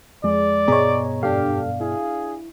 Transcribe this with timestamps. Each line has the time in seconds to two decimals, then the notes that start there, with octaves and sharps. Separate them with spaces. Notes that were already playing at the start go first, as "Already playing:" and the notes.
0.24 F2 G#3 G#4 D5
0.68 G2 B2 B3 G#4 C#5 D#5 A#5
1.23 F2 G#2 D4 G4 A4 F5
1.81 E4 G#4